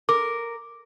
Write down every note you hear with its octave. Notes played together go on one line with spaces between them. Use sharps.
A#4 D6